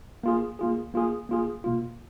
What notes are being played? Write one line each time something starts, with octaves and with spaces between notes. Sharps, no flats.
A#3 F4 G#4
A#3 F4 G#4
A#3 F4 G#4
A#3 F4 G#4
B2 A#3 F4